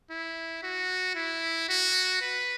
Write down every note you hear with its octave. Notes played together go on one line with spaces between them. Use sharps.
E4
F#4
E4
F#4
B4